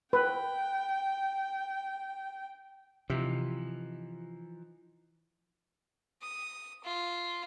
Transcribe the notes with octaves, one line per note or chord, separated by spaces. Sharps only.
B4 G5
C3 E3 F3 D#4
D#6
F4